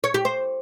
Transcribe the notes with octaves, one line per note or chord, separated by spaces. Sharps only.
C#5
G4
C5